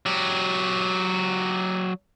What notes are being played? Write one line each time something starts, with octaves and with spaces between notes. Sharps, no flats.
F#3 G4